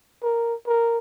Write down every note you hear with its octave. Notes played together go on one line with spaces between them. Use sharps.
A#4
A#4